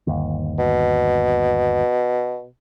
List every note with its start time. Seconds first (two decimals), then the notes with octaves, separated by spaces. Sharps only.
0.07 G1 D#2
0.59 B2